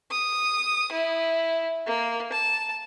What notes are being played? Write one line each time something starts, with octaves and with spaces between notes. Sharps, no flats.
D#6
E4
A#3
A5